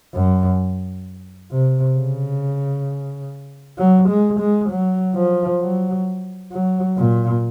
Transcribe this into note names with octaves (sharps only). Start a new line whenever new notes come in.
F#2
C3
C#3
F#3
G#3
G#3
F#3
F3
F#3
F#3
A#2